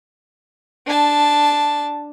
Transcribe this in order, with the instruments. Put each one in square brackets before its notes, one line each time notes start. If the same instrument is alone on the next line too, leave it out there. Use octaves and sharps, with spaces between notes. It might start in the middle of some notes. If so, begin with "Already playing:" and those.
[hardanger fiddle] D4 A5